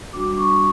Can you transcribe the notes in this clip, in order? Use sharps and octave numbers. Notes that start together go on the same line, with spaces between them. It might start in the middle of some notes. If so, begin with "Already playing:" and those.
G3 D4 F#4 D6
D6
C#6